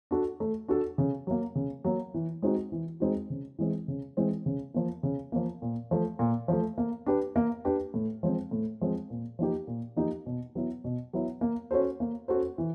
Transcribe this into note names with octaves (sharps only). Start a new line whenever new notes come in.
D4 F#4 A4
A3
D4 F#4 A4
C#3
F#3 A#3
C#3
F#3 A#3
E3
G#3 C4 D#4 F#4
E3
G#3 C4 D#4 F#4
C#3
E3 G#3 C4
C#3
E3 G#3 C4
C#3
F3 A#3
C#3
F3 A#3
A#2
F3 A3
A#2
F3 A3
A#3
D4 G4 B4
A#3
D4 G4 B4
A2
F3 G#3 C4
A2
F3 G#3 C4
A#2
F3 A#3 D#4 G4
A#2
F3 A#3 D#4 G4
B2
F#3 B3 E4
B2
F#3 B3 E4
A#3
C#4 F#4 A4 C5
A#3
C#4 F#4 A4 C5
E3